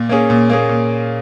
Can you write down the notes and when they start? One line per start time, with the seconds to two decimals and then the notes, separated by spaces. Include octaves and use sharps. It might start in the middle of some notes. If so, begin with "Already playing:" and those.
Already playing: A#2
0.09 A#3 C#4 G#4
0.30 A#2
0.50 A#3 C#4 G#4
0.69 A#2